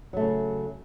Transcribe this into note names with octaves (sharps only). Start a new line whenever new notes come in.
C#3 F#3 A3